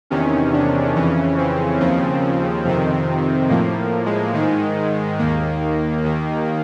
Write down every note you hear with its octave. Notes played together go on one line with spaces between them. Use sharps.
E2 C3 D#3 C#4
D4
F2 C#3 E3 C#4
C4
D#2 C#3 F3
F2 C3 D#3
A2 F3 A#3
G#3
G#2 D#3
D#2 D#3 A#3
D#2 D#3